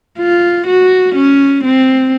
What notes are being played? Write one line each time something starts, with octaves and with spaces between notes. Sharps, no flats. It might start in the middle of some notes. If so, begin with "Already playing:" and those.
F4
F#4
C#4
C4